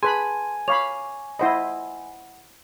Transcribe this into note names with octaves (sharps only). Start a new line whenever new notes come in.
G#4 B4 G#5 A5 B5 C6
C#5 F5 B5 C#6 D6 F7
E4 C5 D#5 F#5 B5